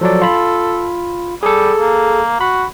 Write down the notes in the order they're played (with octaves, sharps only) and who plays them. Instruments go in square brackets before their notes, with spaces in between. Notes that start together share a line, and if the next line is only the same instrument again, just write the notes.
[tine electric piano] F3 F#3 D5 [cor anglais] A4
[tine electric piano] F4 B5
[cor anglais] G3 [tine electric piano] G#4 A4
[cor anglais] A#3
[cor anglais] F#4 [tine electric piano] B5